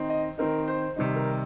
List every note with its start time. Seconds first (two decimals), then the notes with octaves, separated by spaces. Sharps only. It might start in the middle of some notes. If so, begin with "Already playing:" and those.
Already playing: D#3 C4 D#4
0.10 D#5
0.38 D#3 C4 D#4 A#4
0.68 C5
0.96 C3 D#3 G3 D#4
1.16 A#4